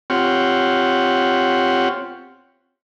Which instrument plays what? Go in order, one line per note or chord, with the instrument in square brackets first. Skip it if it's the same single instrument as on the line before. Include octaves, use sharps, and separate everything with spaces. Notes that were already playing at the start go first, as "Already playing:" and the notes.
[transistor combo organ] C4 F4 G4 C#5 F#5